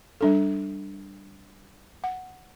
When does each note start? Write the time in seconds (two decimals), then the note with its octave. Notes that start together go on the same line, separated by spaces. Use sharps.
0.21 G3 D4 A4
2.04 F#5